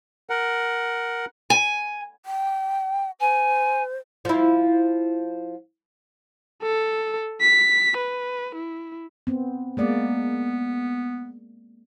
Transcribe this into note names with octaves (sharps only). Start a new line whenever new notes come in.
A#4 F#5
G#5
G5
C5 G#5
F3 E4
A4
B6
B4
E4
B3 C4
G#3 A#3 B3 D5